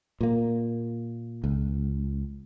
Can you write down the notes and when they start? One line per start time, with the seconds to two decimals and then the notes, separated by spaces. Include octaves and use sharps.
0.21 A#2 A#3
1.44 C#2